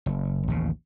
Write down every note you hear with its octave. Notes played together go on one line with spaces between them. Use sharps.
F#1
A1 D#2 C#3